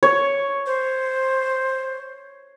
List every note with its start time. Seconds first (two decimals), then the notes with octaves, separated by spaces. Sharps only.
0.03 C#5
0.66 C5